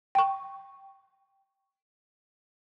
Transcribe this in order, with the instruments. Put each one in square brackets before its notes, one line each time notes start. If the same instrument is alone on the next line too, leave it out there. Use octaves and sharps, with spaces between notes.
[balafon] G5 C#6